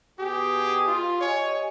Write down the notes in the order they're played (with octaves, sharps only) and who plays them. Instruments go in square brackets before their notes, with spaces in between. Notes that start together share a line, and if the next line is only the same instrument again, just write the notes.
[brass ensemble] B2 G#4 [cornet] G4
[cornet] F4
[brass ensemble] G4 D#5 G#5 [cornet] C#5